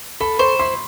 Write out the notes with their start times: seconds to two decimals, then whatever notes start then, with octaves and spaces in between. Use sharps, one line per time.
0.20 A4 B5
0.39 C5 C#6
0.59 E4 C6